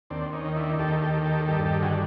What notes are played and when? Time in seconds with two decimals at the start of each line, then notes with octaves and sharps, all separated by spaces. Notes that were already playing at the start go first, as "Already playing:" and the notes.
0.10 D#2 C4 D4
0.33 C#4 D#4
0.45 D#3
0.56 D4 E4
0.79 D#2 G4 A4
1.02 G4 A4
1.14 D#3
1.25 G4 A4
1.48 G2 G4 A4
1.66 G4 A4
1.82 D3 F#4 G#4